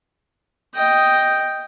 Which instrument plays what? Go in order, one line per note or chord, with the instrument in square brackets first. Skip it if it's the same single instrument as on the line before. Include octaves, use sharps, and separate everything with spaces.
[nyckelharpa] D#5 G5